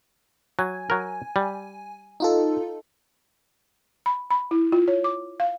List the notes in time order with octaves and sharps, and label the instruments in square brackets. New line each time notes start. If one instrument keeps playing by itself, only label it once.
[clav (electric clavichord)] F#3 [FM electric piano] G#5
[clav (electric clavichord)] F#3 A#4
G3
[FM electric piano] D#4 F4 A4
[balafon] B5
B5
E4
F4
C#5
D6
F5